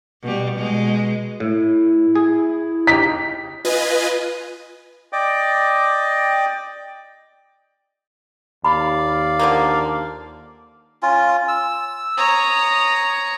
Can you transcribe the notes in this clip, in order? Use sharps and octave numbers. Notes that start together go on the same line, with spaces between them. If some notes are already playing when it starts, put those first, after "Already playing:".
B2 G3
B2 G#3
A2 E4
G#4
D#4 G4 B6
F4 B4 D#5 G#5
D5 D#5 G5 D6
D#2 D5 F5 B5
D3 F3 A#3
C#4 F4
E6
C#5 A#5 D#6